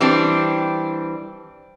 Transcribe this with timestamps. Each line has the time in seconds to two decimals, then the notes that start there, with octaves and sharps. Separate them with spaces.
0.01 E3 G3 C4 D4